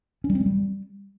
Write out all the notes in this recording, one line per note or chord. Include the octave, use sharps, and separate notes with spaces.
C#4
G3
C4
G#3
G3